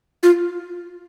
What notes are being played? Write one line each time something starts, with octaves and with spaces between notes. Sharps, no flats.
F4